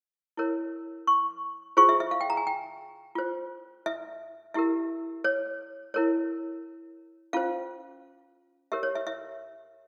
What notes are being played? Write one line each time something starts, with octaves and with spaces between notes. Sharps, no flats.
E4 A#4 C#5
C#6
F4 G#4 C5 C#6
E5
E5
F5
G5
A#5
G#5
G5
F4 C5
E5
E4 G4 A#4 E5
C#5
E4 A#4 C#5
C#4 F4 C5 F5
G4 A#4 C#5 E5
C#5
E5
E5